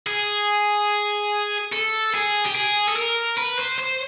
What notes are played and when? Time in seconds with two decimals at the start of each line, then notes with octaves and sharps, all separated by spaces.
0.07 G#4
1.72 A4
2.14 G#4
2.45 G4
2.55 G#4
2.88 A4
2.96 A#4
3.38 B4
3.59 C5
3.79 C5